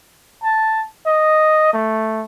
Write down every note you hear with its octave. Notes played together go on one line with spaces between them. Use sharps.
A5
D#5
A3